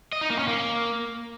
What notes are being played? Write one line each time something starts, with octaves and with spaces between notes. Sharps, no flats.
D#5
D#4
A#3
C#4
A#3